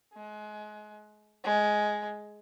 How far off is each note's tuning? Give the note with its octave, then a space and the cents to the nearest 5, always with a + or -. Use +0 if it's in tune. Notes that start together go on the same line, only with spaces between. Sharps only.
G#3 +30
G#3 +10